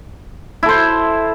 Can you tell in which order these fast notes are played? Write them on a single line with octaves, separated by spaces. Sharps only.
E4 A4 C5